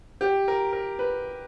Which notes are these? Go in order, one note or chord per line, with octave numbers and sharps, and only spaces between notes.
G4
A#4
A#4
B4